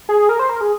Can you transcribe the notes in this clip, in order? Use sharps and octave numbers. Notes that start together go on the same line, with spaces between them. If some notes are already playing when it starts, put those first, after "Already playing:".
G#4
A#4
C5
A#4
G#4